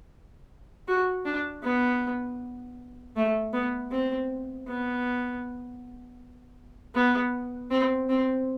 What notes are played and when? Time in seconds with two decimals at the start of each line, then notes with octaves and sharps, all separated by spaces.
0.88 F#4
1.25 D4
1.63 B3
3.16 A3
3.53 B3
3.91 C4
4.68 B3
6.95 B3
7.71 C4
8.09 C4